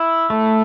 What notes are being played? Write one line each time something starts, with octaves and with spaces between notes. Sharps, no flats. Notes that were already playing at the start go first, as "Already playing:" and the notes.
Already playing: E4
A3